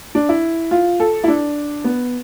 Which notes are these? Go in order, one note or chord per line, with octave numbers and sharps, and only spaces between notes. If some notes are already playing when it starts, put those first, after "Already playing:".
D4
E4
F4
A4
E4
D4
B3